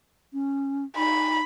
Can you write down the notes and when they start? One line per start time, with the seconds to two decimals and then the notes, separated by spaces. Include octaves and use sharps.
0.33 C#4
0.97 D#4 B5